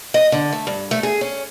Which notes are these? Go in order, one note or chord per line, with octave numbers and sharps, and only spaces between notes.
D#5
D3
A3
G2
A3
G#4
C#4